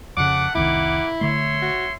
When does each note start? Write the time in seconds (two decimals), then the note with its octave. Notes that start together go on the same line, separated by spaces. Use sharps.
0.17 F2 C#3 A3 F#5 D6
0.55 F1 C2 D#3 A#3 E4 F#5 D6
1.21 D3 A3 C#5 E5 C6
1.62 F#4